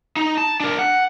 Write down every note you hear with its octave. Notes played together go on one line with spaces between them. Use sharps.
D#4
A5
D4 A#4
F#5